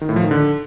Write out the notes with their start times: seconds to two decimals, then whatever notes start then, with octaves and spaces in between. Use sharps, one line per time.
0.01 D#3
0.09 A2
0.16 F3
0.24 D#3
0.31 D3